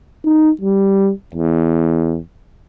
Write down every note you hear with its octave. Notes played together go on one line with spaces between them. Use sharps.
D#4
G3
E2